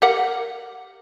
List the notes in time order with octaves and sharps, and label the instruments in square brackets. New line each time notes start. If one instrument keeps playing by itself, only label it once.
[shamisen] G4 A#4 F#5